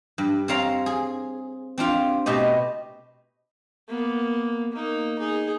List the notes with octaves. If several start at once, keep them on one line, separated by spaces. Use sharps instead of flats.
G2
C4 C#5 F5 A#5
G#4
C4 D4 F4 G4
B2 A3 G4 D#5
A#3 B3
A#3 D#4
D#4 G#4